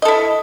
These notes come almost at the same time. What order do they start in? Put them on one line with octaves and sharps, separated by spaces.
D#5 A4 E4